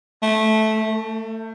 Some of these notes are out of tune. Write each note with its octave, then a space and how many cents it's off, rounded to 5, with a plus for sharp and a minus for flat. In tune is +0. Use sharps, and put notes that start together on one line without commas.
A3 -10
A3 +30